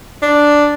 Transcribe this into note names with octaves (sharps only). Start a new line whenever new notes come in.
D4